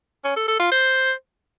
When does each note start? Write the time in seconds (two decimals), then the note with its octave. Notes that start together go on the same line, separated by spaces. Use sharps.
0.24 C#4
0.36 A4
0.48 A4
0.60 F4
0.71 C5